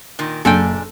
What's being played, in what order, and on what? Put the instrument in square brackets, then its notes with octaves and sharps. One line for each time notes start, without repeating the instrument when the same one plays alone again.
[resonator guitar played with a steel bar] A#2 D#3
[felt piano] F#1 [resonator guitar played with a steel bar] A#2 D4 G#5 [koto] A4 G5